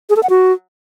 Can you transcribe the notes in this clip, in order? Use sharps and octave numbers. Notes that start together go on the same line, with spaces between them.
G#4
A4
F#5
F#4